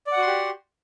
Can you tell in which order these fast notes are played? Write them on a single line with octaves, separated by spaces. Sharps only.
D5 F#5 F#4 C6 G4